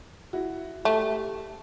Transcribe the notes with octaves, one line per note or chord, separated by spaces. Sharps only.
E4 F#4
A3 G4 A4